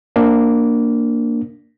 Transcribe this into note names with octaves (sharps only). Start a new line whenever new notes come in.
A#3 D4